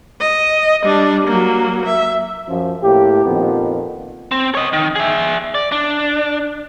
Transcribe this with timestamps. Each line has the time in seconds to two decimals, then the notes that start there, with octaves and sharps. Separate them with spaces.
0.20 D#5
0.83 G3 D4
1.28 F#3 A#3
1.86 E5
2.48 F#2 F3
2.82 A2 A#3 G4
3.26 F2 A#2 D#3 F3 B3
4.31 C4
4.55 C#5 D#5
4.73 D#3
4.96 G#4 E5
5.55 D5
5.72 D4